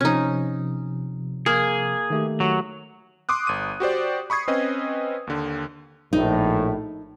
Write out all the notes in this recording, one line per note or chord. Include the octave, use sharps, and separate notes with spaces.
C3 F3 C#4 D#4
A#3 G#4
D#3 A3 G4
F#3
C6 D6 D#6 F#6
G1 D#7
F#4 G4 C5 D5
B5 C#6 D#6 G#6 C7
C4 C#4 B4 D#5
D#2 D3
A#1 A2 D#4